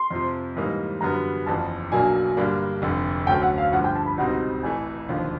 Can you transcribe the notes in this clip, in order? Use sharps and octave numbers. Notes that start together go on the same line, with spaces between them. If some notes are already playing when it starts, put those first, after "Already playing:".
Already playing: C6
F2 C3 F3
G#2 E3 G3 A#3 D#4
F#2 D3 G3 B3 A#5
F#1 E2 C#3 F3 A5
B1 B2 F#3 A#3 D4 G#5
G2 D3 G3 A#3 D4
F1 F2 D3
D2 D3 F#3 A3 C#4 G5
F#5
F5
G2 D3 F3 F#5
G5
A5
B5
C#2 B2 G3 C4 D#4 F#5
A1 A2 E3 A3 G#5
E1 D#2 D3 F3